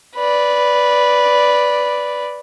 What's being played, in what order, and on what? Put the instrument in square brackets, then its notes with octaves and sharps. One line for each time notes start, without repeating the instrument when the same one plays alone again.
[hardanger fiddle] B4 D5